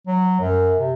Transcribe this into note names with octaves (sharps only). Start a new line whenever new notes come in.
F#3
F#2
C3